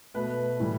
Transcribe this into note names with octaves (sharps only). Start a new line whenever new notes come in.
B2 A3 B4
A2 E3 G3